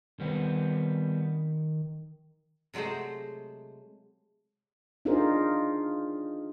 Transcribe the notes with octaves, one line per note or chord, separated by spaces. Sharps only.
D#3 G3 B3 C4
C3 F#3 G#3 A3 C5
D4 D#4 F4 G#4 A#4 C5